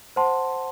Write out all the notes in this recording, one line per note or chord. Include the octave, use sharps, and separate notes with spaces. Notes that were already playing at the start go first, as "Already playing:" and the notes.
C5 F#5 A5 C6